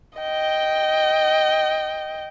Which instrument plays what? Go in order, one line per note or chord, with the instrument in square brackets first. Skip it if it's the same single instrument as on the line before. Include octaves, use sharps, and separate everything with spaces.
[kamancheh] D#5 G5